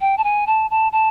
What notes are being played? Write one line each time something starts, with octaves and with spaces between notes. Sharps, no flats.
G5
A5
G#5
A5
A5
A5